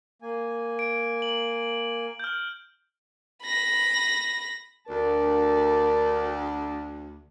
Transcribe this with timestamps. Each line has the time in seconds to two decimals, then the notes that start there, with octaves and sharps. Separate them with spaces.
0.22 A#3 G#5
0.79 D7
1.22 F#7
2.20 F6 G6
3.44 B5 A#6
4.89 D2 A#4 D5 A5